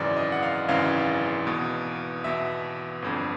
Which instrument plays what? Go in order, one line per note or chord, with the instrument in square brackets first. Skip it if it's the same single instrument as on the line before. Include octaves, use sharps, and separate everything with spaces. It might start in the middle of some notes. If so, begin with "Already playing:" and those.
Already playing: [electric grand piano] G#1 F#2 C#3 E3 D5
D#5
F#5
F5
G#1 F#2 C#3 E3 F5
E2 B2
E2 B2 E5
G1 F2 D3